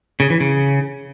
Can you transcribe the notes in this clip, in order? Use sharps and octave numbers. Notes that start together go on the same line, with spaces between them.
C#3
E3
C#3